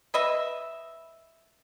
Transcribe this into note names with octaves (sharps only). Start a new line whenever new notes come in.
B4 D#5 E5